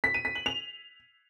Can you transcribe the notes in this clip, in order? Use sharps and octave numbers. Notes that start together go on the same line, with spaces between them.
B6
D#7
B6
F#7
F7